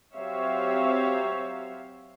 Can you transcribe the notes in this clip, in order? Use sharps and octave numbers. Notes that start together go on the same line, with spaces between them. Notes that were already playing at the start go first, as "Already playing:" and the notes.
F#3 C4 G4 C#5 E5 F5